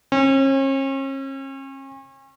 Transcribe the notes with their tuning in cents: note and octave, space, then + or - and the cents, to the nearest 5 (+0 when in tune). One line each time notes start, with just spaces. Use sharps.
C#4 -40